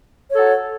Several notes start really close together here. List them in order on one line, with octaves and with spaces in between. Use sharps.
C#5 A4 F#4